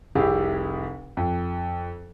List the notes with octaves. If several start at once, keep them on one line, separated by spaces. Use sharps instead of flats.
F1 C2 E4 G4 G#4 F5
F2